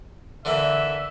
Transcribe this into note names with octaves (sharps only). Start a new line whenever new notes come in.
D3 E3 A#3 E5